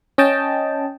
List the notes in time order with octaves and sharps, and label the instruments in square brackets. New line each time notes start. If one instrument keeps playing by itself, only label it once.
[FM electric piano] C#4 D#5 G5 A5